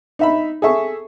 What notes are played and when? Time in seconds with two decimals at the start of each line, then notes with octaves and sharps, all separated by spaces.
0.19 D#4 E5 B5
0.62 G#4 A4 E5 C#6